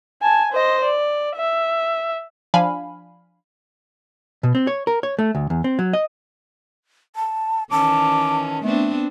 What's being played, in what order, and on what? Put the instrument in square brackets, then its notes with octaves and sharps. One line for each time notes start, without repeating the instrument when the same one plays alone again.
[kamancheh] G#5 A5
C5 D#5
D5
E5
[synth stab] F3 D4 F5 G#5 B5
[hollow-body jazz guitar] B2
C4
C#5
A#4
C#5
A3
D2
E2
C4
F#3
D#5
[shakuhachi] A5
[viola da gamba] D#3 E3 C#4 [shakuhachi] A5 [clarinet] D6
[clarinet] A3 [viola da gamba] B3 C4 D4